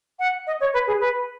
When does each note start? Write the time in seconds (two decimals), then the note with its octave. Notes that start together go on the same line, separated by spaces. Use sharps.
0.19 F#5
0.46 D#5
0.60 C#5
0.73 B4
0.87 G#4
1.00 B4